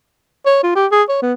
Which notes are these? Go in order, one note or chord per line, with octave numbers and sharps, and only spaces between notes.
C#5
F4
G4
G#4
C#5
B3